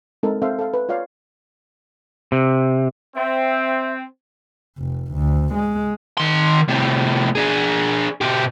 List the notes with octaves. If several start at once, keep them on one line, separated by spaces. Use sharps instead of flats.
G#3 C4 D#4 A4 A#4
C4 A4 C5 E5 F5
A4 F5
B4
F4 C#5 D5 F5
C3
C4 E5
F1
D2
G#3
D#3 C6
A2 C3
D4 G#4
B2 G4